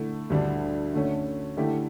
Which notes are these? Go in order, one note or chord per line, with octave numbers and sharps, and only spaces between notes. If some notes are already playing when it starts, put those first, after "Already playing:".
Already playing: D3 A3 E4
D2 D3 G3 D4
D3 A3 C#4
D3 A3 E4 G4